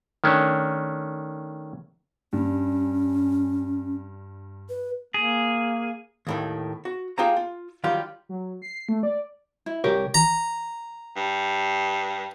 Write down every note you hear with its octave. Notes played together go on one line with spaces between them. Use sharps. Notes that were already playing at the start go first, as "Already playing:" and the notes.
D#3 A3 C#4 D4
G2 C#4
B4
A#3 G#4
D#2 A2 D#3
F#4
A#3 F4 G4 G#4 A5 A#5
F4
D#3 F#3 G3 F4 G4
F#3
C7
A3
D5
E4
C2 G4 A#4 C#5
A#5
G2